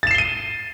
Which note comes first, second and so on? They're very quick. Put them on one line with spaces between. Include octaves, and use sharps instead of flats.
A6 E7 C7 G7 D#7